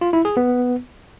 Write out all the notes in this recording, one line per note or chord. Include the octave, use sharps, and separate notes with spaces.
F4
E4
G#4
B3